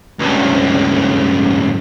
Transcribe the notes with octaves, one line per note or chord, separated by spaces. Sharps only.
C#2 G2